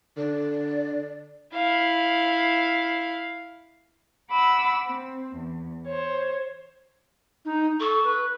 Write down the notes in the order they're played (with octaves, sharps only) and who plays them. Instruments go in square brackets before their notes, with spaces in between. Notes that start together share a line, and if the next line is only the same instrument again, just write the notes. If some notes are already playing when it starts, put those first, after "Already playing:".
[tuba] D3 [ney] D5
[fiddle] E4 F5
[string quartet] F#5 B5 D6 E6
C4
E2
C5 C#5
[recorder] D#4
[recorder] A4 [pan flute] C#6
[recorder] B4